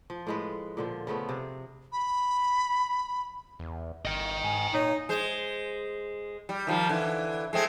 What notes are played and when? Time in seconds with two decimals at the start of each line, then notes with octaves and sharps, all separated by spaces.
0.10 F3
0.27 A2 G#3 B4
0.77 A#2 D3 F3
1.07 C#3 F3 A3 B3
1.29 C3 G#4
1.92 B5
3.59 E2
4.05 G1 D#5 G5
4.44 G#2 G#5
4.74 A#2 D#4 C#5
5.09 G#3 C5
6.49 G3
6.67 D#3 F3 G3
6.89 D3 E3
7.53 G#3 A3 C4